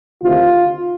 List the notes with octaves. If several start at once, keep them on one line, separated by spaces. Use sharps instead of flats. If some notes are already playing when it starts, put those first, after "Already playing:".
D2 C3 D#3 F4